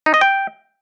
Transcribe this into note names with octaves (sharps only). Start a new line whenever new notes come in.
D#4
D#5
G5